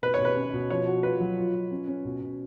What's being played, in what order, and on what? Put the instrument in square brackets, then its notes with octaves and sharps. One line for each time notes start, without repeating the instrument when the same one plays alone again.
[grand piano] B2 [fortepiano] B4
[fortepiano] C#5
[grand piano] B2
[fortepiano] B4
[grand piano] C#4
B2
[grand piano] F3 [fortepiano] C#5
[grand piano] F#4
[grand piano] F4 [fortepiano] B4
[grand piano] F#3
F4
F4
C#4
C#4
B2
B2